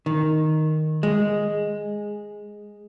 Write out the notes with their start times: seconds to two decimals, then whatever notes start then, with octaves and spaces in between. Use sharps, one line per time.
0.06 D#3
1.03 G#3